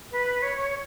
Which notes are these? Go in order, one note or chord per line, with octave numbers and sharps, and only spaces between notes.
B4
C#5